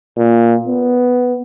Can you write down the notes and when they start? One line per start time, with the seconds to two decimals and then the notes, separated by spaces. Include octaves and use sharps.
0.18 A#2
0.68 B3